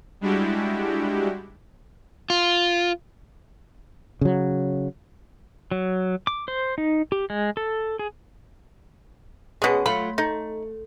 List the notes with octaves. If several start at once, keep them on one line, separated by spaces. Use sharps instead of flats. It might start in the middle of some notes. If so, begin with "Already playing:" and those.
G3 G#3 D4 E4 F#4 G4
F4
C#3 F#3
F#3
D6
C5
D#4
G4
G#3
A4
G#4
B2 G#3 C#4 G#4
F#3 A3 F4 B5
A3 D#4